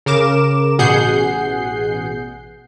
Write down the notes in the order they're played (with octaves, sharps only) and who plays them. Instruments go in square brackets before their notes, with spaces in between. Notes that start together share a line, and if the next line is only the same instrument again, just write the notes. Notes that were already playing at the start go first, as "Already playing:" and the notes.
[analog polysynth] C#3 A#4 D6 E7
A1 B2 G#4 F#5 G6 C7